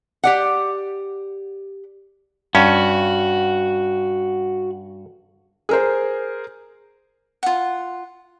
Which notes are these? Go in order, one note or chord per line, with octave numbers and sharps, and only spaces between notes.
G4 D5 F#5
G2 C#4 F#4
G#4 A#4 C5
F4 F#5